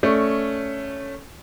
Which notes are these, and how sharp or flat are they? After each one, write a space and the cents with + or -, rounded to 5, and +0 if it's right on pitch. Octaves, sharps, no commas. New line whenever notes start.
A3 +0 C#4 +0 D5 +0